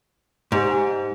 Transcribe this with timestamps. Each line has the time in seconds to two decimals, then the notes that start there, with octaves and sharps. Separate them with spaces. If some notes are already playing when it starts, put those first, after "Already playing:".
0.52 G#2 G4 G#5
0.70 F#5 G#5